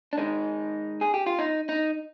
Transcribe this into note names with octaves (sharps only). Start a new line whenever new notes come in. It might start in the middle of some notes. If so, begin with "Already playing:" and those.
D4
G#2 D#3 G#3 D#4
G#4
G4
F4
D#4
D#4